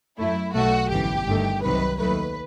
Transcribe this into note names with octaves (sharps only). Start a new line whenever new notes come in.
F#2 F#3 A3 E4
B1 B2 F#3 A3 F#4
G1 F#2 E3 G4
G1 G2 D#3 A3
C2 C3 D#3 F#3 B4
D#2 D#3 F#3 A3 B4